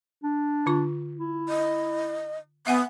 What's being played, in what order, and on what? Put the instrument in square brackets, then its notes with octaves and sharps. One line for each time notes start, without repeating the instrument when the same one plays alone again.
[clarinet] D4
[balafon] D3 F4 C#6
[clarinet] E4
[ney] D#5
[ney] B3 [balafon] E5 F#5 G#5